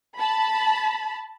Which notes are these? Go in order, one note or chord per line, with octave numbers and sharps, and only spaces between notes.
A5 B5